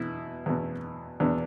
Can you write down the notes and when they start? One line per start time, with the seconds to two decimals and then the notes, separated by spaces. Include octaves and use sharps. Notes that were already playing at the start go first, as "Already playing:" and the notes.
Already playing: E2 B2 E4
0.46 E2 B2
1.20 E2 B2 D4